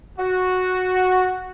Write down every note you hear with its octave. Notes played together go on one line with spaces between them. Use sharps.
F#4